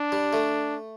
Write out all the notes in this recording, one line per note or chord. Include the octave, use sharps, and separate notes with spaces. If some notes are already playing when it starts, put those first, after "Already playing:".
Already playing: D4
G3
A3